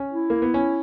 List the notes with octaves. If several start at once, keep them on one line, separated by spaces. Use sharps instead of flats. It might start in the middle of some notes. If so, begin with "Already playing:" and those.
Already playing: C#4
E4
A#3
B3
C#4